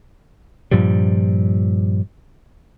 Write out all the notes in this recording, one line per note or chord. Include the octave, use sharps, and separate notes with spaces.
G2 A#2 F3 G3